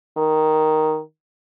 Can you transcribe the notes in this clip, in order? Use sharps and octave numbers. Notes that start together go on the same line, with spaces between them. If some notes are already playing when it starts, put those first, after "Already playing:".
D#3